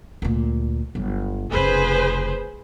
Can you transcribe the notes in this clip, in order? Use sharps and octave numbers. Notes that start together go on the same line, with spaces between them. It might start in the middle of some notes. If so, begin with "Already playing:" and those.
D2 A#2
G1 F#3
F1 C#3 G#4 B4 C5